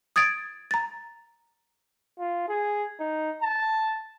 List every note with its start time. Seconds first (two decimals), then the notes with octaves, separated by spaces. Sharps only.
0.16 D#6 G#6 A6 D7
0.71 A#5 A6
2.19 F4
2.48 G#4
3.00 D#4
3.42 A5